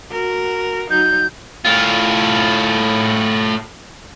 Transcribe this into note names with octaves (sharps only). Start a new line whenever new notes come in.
F#4 A#4
F#3 D#4 G6
A2 F4